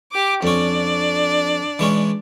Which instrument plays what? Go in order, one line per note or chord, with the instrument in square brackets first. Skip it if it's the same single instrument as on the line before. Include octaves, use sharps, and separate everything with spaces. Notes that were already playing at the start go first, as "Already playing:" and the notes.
[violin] G4 D6
[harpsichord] F2 C#4 [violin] D4 D5
[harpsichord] E3 G#3 C#4